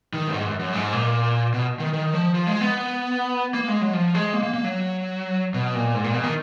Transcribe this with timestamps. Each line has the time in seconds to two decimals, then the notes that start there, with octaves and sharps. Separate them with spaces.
0.13 D#3
0.28 F#2
0.34 G#2
0.46 F#2
0.59 F#2
0.73 G#2
0.93 A#2
1.54 B2
1.80 D#3
1.93 D#3
2.13 F3
2.34 F3
2.47 G#3
2.61 B3
3.54 A#3
3.68 G#3
3.81 F#3
3.93 F3
4.15 G#3
4.33 A#3
4.43 A#3
4.54 A#3
4.64 F#3
5.54 B2
5.75 A#2
5.95 G#2
6.04 A#2
6.14 B2
6.24 D#3